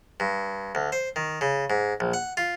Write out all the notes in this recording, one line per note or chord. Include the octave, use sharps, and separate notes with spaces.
G2
D2
C5
D#3
C#3
G#2
A#1
F#5
F4